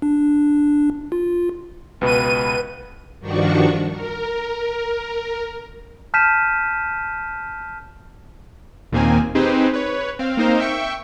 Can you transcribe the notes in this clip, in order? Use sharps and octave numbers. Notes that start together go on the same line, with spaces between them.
D4
F4
C#2 B2 B4 D#7
G2 D#3 F3 D4 F#4 C#6
A#4
A5 F6 G6 B6 D#7 E7
D#2 A#2 D#3 A#3 C4 G#5
C4 D#4 G4 G#4 B4 C5
B4 C#5
C4 F5
A#3 C4 D#4 A#4 C5 F5
E5 G5 C#6